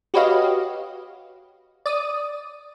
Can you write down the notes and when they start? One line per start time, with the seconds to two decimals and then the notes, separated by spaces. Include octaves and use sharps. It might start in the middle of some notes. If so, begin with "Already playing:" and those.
0.14 F#4 G4 B4 C#5 D#5 F5
1.86 D5 D#6